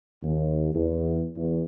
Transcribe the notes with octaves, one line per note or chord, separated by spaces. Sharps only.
D#2
E2
E2